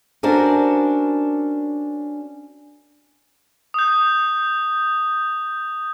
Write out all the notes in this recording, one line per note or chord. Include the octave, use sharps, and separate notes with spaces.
C#4 D4 F#4 A#4 C5 D5
D#6 G6